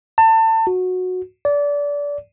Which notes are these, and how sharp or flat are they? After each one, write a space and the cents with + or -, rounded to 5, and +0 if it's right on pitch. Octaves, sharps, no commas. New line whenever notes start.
A5 +30
F#4 -15
D5 -25